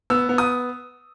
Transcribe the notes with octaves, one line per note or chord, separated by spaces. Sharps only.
B3 E6
B3
D#6